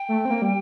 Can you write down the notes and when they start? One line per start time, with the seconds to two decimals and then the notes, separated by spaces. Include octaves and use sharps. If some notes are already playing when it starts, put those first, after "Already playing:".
Already playing: G5
0.09 A3
0.25 C4
0.31 A#3
0.42 G3